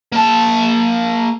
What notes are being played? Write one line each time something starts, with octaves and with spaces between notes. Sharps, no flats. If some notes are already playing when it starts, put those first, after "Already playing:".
A#3 A5